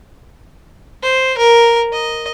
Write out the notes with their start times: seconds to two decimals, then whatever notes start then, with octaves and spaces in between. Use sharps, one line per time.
1.03 C5
1.38 A#4
1.92 D#5